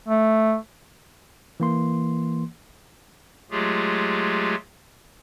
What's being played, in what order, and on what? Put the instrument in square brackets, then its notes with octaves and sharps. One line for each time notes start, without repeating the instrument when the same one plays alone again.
[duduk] A3
[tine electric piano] E3 A#3 C6
[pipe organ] F#3 G#3 A3 F4 G4 G#4